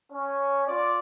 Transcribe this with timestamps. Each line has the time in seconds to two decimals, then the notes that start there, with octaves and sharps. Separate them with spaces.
0.12 C#4
0.67 F4 D5